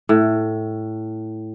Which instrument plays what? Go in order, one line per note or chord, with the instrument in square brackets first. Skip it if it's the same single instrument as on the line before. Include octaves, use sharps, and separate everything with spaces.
[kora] A2